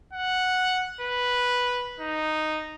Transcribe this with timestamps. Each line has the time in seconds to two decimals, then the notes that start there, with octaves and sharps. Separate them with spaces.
0.13 F#5
1.01 B4
2.00 D#4